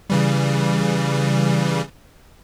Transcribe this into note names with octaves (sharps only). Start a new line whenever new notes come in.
C#3 E3 G3